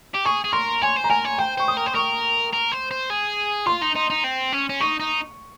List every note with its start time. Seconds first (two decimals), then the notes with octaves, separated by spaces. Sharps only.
0.14 G4
0.25 G#4 C#6
0.44 G#4
0.53 A#4 C6
0.82 C#5 G#5
0.97 C5
1.04 A#5
1.10 A#4 G#5
1.25 C#5
1.38 C5 G5
1.58 C5 C#6
1.68 D#6
1.77 A#4
1.86 C5
1.95 A#4 C#6
2.53 A#4
2.72 C5
2.91 C5
3.10 G#4
3.66 F4 C6
3.82 D#4
3.95 D#4
4.10 D#4
4.24 C4
4.52 C#4
4.69 C#4
4.80 D#4 C#6
5.00 D#4